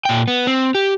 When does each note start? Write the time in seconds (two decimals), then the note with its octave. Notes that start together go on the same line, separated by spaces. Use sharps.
0.05 A#2 G5
0.28 B3
0.47 C4
0.75 G4